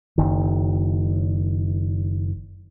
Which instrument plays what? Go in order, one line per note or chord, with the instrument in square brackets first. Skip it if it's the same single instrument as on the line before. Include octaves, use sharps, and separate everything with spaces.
[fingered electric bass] F#1 D#3